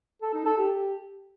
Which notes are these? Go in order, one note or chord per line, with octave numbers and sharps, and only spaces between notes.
A4
D#4
A4
G4